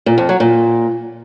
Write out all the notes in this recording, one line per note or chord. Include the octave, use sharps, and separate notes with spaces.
A#2
F2
F#3
A#2